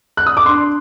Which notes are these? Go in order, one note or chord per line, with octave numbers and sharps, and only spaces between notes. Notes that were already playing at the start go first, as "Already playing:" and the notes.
F#6
D#6
D6
D4 C6